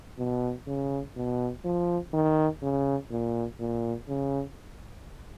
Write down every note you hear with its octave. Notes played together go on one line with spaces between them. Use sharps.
B2
C#3
B2
F3
D#3
C#3
A#2
A#2
C#3